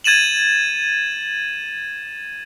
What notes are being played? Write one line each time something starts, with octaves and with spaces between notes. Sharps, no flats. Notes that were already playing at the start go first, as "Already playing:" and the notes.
G#6 A6 D#7 E7 F#7